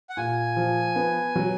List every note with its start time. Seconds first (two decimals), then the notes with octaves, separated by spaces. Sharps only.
0.10 F#5
0.17 A#2 G#5
0.56 F3
0.96 B3
1.35 F#3